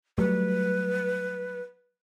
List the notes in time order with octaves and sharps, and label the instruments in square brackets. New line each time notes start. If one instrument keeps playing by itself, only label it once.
[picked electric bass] F#3 G3 A3 [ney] B4